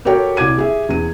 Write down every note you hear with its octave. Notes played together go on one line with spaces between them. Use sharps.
F#4 G4 A4 A#4 C#5 G5
C2 D6 G#6 D#7
G4 G#4 E5
E2 D#7